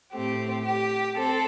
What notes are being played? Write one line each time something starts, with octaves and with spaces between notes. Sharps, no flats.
A2 A3 C4 G4
G4
C4 A4